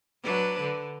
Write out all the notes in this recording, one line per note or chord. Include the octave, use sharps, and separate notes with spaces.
F#3 D4 B4
D3